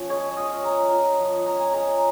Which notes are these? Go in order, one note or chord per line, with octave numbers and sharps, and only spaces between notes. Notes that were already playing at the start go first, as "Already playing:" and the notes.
Already playing: F3 C#4 F4
G#3 C#5
F4 D#5
G#3 A#5
F4
F3
C#4 A#5
G#5
G#3 A#5